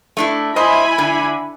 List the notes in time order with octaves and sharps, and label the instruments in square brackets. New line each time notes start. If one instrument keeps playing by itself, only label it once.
[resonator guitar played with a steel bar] A3 D4 E4
[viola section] E4 G#5 B5 [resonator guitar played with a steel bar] C5 D#5
[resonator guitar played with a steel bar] D3